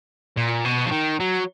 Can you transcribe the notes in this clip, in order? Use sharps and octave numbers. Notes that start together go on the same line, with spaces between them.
A#2
B2
F3
D#3
F#3